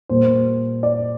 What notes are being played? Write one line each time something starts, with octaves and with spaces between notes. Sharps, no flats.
A#2 G3 A#3 C5
D5